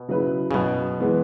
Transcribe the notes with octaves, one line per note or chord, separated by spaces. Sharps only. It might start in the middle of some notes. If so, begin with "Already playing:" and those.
Already playing: B2
C#3 F#3 E4 B4
C#3
F#2 B2
E3 G#3 B3